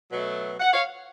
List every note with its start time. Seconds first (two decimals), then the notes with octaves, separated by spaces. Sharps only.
0.11 B2 F#3 A3
0.60 F#5
0.72 C#5 F5